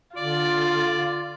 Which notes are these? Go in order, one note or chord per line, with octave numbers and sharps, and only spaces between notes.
D3 F4 D5